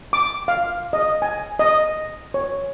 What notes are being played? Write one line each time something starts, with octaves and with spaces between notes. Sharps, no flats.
D6
F5
D#5
G#5
D#5
C#5